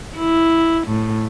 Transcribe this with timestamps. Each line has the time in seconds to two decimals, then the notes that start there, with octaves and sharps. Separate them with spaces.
0.16 E4
0.87 A2